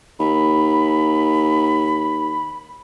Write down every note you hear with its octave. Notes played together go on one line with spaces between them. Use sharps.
D#2 B5